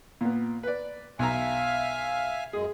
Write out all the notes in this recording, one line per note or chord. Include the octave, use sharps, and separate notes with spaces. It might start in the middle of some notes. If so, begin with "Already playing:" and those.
A#2 B3
B4 D5
B1 E5 F5 G#5 A#5
F#2 G#3 G#4